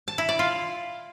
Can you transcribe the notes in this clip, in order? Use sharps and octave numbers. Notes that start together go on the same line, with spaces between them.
A5
E4
D5
F4